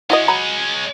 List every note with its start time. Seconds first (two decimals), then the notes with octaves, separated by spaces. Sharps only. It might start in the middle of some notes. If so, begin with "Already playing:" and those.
0.10 G#3 C#4 E4 F#4 D#5
0.28 F#3 A#5 B5